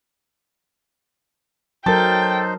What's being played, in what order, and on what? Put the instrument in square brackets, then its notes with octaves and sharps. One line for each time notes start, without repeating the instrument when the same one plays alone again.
[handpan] F#3 A#4 [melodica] D#4 C5 [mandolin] A4 [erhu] G5